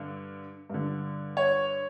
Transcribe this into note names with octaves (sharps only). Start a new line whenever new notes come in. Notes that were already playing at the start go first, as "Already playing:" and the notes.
Already playing: G2 D3
G2 D3
C#5